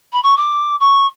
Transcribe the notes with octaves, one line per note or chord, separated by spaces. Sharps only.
B5
C#6
D6
C#6